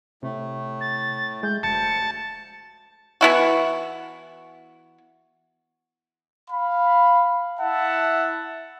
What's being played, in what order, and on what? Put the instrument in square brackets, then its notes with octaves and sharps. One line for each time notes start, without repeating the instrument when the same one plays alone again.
[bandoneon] A2 A3 [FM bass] C3
[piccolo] A6
[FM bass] G#3 [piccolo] G6
[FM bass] F1 [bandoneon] D2 [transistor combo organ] A5 [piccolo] C#7
[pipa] E3 B3 E4 F#4
[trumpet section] F5 B5
E4 E5 F#5 A5